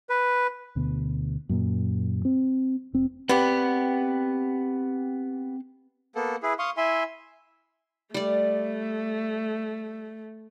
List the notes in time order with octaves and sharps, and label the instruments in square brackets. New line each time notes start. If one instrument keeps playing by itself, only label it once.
[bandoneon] B4
[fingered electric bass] D2 B2
F#2 A#2
C4
F1 C4
[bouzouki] B3 G4 [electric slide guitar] C4 D5 F#5
[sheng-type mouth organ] A#3 B3 A4
E4 G#4 B4
F5 C6 C#6 D#6
E4 E5 G#5 C6
[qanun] G3 D5 [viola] A3